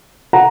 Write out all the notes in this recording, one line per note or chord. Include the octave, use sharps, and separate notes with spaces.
F#5 A#5